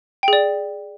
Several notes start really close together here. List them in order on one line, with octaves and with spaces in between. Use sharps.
G5 G#4 D5